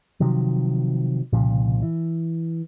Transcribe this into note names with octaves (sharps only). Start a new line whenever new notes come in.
C3 D#3 F3 F#3
C2 A#2 C#3 F3
E3